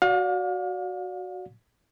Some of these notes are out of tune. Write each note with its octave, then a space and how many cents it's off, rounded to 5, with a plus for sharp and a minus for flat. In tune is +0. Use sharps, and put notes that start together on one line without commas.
F#4 +0 D5 -25 F5 +40